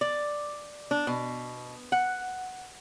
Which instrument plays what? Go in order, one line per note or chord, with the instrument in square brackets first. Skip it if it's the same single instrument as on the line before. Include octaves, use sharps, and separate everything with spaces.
[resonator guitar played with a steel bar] D5
D4
B2
F#5